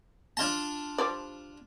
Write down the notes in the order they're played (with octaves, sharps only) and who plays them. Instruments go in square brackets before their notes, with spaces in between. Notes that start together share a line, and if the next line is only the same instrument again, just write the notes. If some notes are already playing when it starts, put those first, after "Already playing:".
[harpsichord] D4 F4 A5
[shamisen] F3 G3 D5